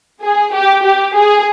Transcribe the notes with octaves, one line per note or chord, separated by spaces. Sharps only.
G#4
G4
G4
G#4